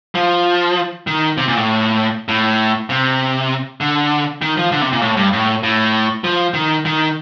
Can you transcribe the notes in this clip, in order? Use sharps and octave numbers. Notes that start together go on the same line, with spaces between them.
F3
D#3
C3
A#2
A2
A2
C3
D3
D#3
F3
D3
C3
A#2
A2
G2
A2
A2
F3
D#3
D#3